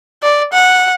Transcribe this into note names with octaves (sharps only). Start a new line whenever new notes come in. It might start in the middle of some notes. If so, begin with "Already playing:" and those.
D5
F#5